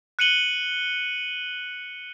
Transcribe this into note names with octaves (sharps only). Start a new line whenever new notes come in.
F#6 C#7 D#7 F#7 G7